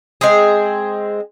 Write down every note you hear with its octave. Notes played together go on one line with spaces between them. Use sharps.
G#3 C4 G#4